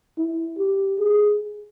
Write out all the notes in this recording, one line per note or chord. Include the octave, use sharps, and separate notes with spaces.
E4
G4
G#4